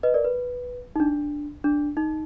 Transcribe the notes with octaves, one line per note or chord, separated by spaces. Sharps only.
B4 D#5
A#4 D5
B4
D#4
D4
D4
D#4